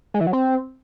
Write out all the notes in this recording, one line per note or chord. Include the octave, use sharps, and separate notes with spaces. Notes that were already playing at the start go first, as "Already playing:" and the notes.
G#3
E3
F#3
C4